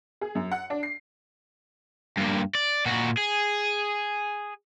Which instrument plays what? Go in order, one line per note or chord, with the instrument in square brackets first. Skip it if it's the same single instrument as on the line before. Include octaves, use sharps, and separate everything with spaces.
[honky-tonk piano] G#4
F#2
F#5
D4
C7
[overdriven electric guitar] G2 A#2
D5
A#2 F#4
G#4